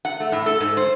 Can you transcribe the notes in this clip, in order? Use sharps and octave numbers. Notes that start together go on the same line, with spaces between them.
F#5
A3
A2
A4
G#2
C5